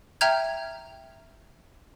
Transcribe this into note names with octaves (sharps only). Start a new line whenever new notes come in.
E5 G5 A#5 F6 G6 G#6